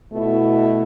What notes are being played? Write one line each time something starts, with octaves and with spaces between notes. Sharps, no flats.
B2 A3 E4